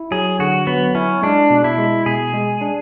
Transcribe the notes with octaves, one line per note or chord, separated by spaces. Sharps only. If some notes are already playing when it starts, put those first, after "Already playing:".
Already playing: E4
F#3 G#4
D3 F#4
F#3 B3
C#4 E4
G#3 D4
B2
E4
G#3
B2 G#4
G#3
D4